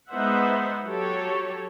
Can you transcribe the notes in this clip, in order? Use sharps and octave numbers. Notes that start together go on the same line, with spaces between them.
G#3 B3 D#4 C5 E5 F#5
F#3 G4 A4 C#5